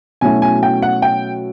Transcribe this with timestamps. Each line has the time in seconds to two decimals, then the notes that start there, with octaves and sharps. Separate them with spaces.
0.21 B2 F#3 A3 C#4 E4 G#5
0.42 G#5
0.63 G5
0.82 F#5
1.02 G5